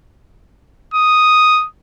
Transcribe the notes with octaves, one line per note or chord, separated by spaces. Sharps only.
D#6